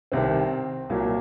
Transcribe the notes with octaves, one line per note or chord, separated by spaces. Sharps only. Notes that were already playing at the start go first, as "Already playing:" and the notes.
C2 C3 D#3 C4
C2 A#2 F#3 A#3